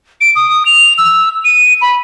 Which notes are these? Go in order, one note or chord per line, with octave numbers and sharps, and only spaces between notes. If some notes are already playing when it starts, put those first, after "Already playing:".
D7
D#6
F7
E6
D#7
B5